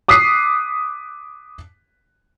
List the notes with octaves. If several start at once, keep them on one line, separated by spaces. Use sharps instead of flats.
D6 D#6 F#6 B6 C7 D#7